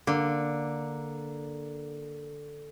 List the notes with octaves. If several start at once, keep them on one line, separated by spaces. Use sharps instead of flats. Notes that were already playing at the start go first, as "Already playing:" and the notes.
D3 A#3